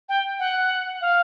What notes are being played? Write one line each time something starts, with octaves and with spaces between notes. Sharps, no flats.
G5
F#5
F5